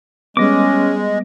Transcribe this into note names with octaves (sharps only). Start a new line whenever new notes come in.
G3 G#3 B3 C#4 D#5 D6